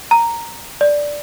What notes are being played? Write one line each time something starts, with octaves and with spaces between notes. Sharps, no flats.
A#5
D5